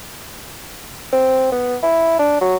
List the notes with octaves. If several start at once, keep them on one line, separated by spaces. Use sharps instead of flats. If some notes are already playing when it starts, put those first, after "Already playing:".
C4
B3
E4
D4
F#3